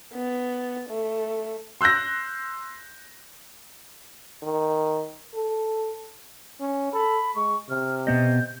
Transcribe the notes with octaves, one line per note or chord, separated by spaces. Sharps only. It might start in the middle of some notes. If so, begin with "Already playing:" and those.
B3
A3
C6 E6 F#6 G6 A#6
D#3
A4
C#4
A4 B5
G#3 C#6
C3 F6
B2 B3 D#5 G6